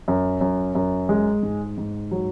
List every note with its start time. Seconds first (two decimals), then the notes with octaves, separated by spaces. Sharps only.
0.08 F#2
0.41 F#2
0.75 F#2
1.09 G#3
1.43 G#2
1.78 G#2
2.11 F#3